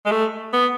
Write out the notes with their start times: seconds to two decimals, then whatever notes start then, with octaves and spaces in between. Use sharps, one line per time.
0.06 G#3
0.11 A3
0.53 B3